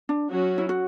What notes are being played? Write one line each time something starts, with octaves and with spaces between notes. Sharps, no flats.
D4
F#3 C#4 F#4
E4
F#4